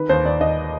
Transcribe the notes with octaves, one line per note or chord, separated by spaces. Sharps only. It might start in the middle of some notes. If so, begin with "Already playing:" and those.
Already playing: D#3 B4
D#2 C5
D#2 D5
D#2 D#5